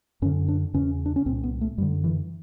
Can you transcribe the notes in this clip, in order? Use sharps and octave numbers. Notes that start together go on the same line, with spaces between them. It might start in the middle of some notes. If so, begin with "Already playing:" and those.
F#2 D3 C#4
D4
E2 C#3 C#4
D4
C#4
C2 A#2 C4
B3
A3
F#2 D3 G3
E3